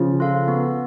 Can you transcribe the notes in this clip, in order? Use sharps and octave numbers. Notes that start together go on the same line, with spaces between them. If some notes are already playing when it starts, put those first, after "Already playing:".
Already playing: C#3 F3
F4 A4 F5
B3